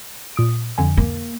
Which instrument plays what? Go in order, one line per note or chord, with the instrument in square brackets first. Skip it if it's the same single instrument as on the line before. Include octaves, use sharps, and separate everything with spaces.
[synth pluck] A#2 D#6 D7
F2 D3 G#5
[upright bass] A#3